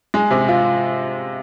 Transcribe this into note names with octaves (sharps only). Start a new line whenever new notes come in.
G#3
C3
F4